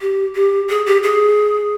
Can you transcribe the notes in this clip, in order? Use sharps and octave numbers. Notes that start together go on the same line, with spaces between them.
G4
G4
G#4
G4
G#4